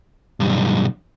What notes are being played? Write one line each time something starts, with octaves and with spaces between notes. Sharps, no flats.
B1 G2